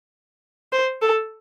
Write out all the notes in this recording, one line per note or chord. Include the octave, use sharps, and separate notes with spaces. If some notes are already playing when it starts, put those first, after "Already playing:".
C5
A4